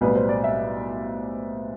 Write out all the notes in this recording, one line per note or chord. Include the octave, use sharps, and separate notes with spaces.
B1 A2 G3 B3 B4
C5
D5
E5